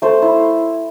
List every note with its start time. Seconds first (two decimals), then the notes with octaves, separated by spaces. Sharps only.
0.02 A3 C5
0.22 E4